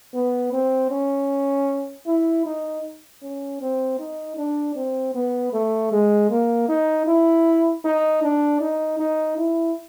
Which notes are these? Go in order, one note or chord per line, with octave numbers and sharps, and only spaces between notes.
B3
C4
C#4
E4
D#4
C#4
C4
D#4
D4
C4
B3
A3
G#3
A#3
D#4
E4
D#4
D4
D#4
D#4
E4